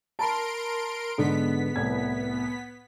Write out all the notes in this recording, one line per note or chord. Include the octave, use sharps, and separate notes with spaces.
A#4 A5 B5 C6 D7
G#2 D3 B3 B6
C2 A2 G#6